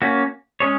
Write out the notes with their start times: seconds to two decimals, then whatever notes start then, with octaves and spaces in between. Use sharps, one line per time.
0.02 A#3 C#4 F#4
0.60 G#3 C#4 G#4 C#5